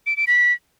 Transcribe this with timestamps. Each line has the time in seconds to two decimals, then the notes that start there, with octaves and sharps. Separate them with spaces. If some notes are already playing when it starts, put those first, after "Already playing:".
0.07 D7
0.17 D7
0.27 B6